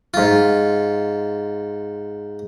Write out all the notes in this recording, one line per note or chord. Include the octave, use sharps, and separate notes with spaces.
G#2 F4